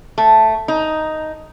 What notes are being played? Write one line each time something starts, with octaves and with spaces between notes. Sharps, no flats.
A3
D#4